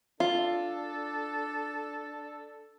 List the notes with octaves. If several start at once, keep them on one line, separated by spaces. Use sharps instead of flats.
D4 F4 A4